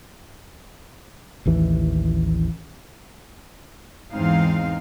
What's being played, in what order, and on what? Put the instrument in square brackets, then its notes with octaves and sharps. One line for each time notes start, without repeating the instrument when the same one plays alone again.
[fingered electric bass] A1 D#2 E3
[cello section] E2 G#2 E3 C4 D#4 F5